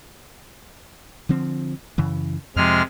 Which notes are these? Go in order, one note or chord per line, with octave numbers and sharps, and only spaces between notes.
D3 F3 C4
F#2 C#3 E3
F2 C3 F3 G#3 F6